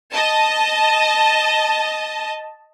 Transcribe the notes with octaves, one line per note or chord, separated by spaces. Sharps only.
D#5 A5